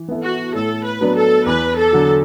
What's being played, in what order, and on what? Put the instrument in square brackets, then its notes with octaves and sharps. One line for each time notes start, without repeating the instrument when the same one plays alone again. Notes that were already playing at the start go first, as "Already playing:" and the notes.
Already playing: [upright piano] E3
B3 E4 A4
[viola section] F#4
[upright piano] A2 [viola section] A4
[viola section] B4
[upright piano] F#3 B3 D4
[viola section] A4
[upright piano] E2 [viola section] B4
[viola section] A4
[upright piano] D3 F#3